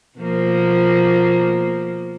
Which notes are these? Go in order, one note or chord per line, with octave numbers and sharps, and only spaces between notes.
B2 F3 A#3